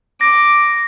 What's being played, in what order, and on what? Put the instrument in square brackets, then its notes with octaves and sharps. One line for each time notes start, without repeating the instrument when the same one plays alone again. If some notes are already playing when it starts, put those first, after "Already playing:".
[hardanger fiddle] D6 [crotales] A#6